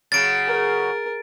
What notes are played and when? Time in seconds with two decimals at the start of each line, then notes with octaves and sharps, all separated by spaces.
0.12 C#3 F#3 A6 D7
0.45 G#4 A#4